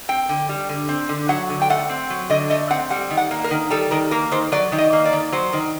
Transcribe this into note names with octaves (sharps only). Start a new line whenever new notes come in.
C4 G5
D3
G3
D3
C4
D3
F#3 F#5
D3
G5
A3 F#5
C4
F#3
D3 D#5
A3 D#5
C4 F#5
G3 F#5
D#3
F#5
A#3
A#4
D#3
G3 A4
D#3 A#4
A#3 A#4
D#3 C5
F#3 D5
D#3
D#5
A#3
D5
D#3
F#3 C5
D#3